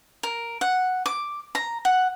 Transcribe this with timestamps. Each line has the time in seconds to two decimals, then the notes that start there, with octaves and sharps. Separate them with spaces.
0.23 A#4
0.61 F#5
1.06 D6
1.55 A#5
1.85 F#5